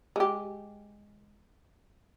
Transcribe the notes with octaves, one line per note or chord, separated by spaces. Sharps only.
G#3 G4